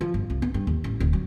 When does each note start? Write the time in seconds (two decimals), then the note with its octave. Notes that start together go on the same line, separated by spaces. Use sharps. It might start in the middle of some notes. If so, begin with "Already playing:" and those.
0.01 F3
0.14 G1
0.30 C2
0.42 B3
0.54 G2
0.67 D#2
0.84 A1
1.00 D1
1.13 F#3